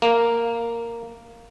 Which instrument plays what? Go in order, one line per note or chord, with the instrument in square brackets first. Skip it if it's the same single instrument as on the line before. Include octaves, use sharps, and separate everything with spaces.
[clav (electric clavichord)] A#3